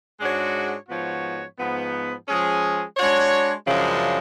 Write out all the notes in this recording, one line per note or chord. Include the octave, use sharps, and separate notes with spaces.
G#2 G#3 D4 F#4 C#5
G#2 F3 B3 F#4 C#5
G#2 F3 B3
F3 G#3 C#4 G#4
G#3 D4 F#4 C#5
F#2 C#3 F3 G#3 D4